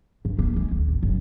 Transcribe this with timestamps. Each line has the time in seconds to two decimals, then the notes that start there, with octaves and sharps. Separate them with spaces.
0.25 G2
0.39 A#3
0.56 G#3
0.71 D2
0.88 G#1
1.03 F#1